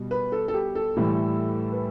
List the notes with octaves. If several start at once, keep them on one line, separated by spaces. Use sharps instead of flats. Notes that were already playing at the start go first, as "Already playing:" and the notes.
Already playing: B2 G3
B4
A4
A4
G4
A4
A2 E3 G3
B4